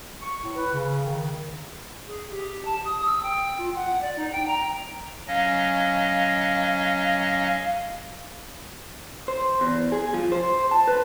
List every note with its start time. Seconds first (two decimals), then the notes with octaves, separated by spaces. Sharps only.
0.22 C#6
0.42 A2
0.56 B4
0.73 C#3
1.05 D#3
2.07 G#4
2.30 G4
2.65 A5
2.84 D#6
3.06 E6
3.23 G5
3.58 F4
3.75 F#5
4.01 D5
4.17 D#4
4.32 G5
4.47 A#5
5.28 F#3 C#4 D#5 F5
9.28 C5
9.61 E2
9.92 G#4
10.14 F3
10.32 C5
10.71 A5
10.87 B4